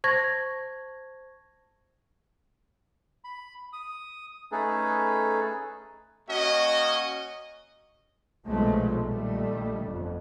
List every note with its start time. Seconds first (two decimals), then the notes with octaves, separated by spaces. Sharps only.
0.04 C5 A5 C#6 G#6 A#6
3.24 B5
3.73 D#6
4.52 A3 C#4 D#4 G#4 A4 B4
6.29 A#3 C#4 F#4 D#5
8.46 B1 A#2 F3 G#3 A3
9.03 A#1 D#3 G3 A3
9.83 G1 F2